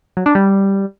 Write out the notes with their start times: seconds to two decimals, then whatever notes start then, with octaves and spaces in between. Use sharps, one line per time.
0.17 F#3
0.26 D4
0.35 G3